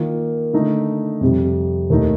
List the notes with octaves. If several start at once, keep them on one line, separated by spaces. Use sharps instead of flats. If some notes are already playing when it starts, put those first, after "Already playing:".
Already playing: D#3 A#3 F4
D3 A3 D#4
F2 C3 G3
D#2 D#3 A3 D#4